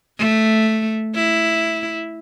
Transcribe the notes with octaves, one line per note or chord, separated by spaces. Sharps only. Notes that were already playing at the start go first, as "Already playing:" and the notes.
A3
E4